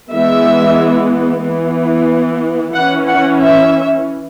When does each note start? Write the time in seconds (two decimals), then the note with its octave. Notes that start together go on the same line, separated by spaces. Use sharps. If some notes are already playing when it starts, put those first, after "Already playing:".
0.12 E3 G#3 B3 E5
1.43 E3 B3
2.74 E3 C#4 F#5
3.07 F#5
3.40 E5